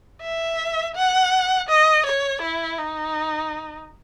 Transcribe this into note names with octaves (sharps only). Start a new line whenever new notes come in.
E5
F#5
D#5
C#5
E4
D#4